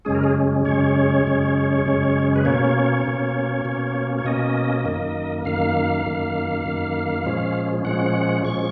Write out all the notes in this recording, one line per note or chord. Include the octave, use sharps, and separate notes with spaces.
F#2 C#3 G#3 C#4 G#4
A#4
G#4
F#2 C#3 G#3 C#4 C#5
F#2 C#3 G#3 C#4
F#2 C#3 G#3 C#4
B4
B2 A#3 C#4 C#5
B2 A#3 C#4
B2 A#3 C#4
C#5
B2 A#3 C#4 D#5
F#2 D#3 A#3
F#2 D#3 A#3 F5
F#2 D#3 A#3
F#2 D#3 A#3
A#2 F3 G#3 C#4
A#2 F3 G#3 C#4 F#5
A#2 F3 G#3 C#4 C#6